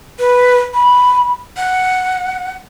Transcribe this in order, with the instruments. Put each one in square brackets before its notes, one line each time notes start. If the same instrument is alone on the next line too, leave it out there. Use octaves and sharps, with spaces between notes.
[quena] B4
B5
F#5